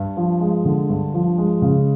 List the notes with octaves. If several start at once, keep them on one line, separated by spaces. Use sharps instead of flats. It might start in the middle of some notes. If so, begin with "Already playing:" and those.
Already playing: G2
F3
G#3
D3
G2
F3
G#3
C#3